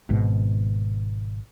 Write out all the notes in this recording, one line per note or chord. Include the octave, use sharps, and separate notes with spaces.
G#1 G#2 B2